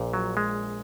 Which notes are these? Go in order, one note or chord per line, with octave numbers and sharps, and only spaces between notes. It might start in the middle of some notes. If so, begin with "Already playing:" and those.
Already playing: A#1 A#2
F#3
G#3